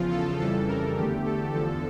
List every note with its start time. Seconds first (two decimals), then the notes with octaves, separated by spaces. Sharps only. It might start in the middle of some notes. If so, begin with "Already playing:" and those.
Already playing: E2 C#3 F3 F4
0.12 A4
0.39 F2 C#3 E3 G3 A4
0.69 A#4
0.97 E2 D3 A3 G4
1.26 A4
1.54 E2 D3 F3 A4